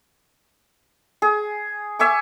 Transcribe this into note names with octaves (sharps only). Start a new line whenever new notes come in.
G#4
E5 G#5 C#6 D6